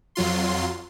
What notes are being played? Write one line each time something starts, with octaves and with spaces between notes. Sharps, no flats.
F2 F#3 F4 C6